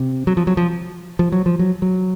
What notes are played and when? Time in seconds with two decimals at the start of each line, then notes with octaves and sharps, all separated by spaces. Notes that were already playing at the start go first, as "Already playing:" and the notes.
Already playing: C3
0.27 F#3
0.37 F3
0.47 F#3
0.57 F3
1.19 F3
1.32 F#3
1.46 F3
1.59 F#3
1.82 F#3